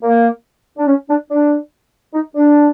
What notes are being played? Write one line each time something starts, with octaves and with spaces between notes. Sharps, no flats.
A#3
D4
C#4
D4
D4
D#4
D4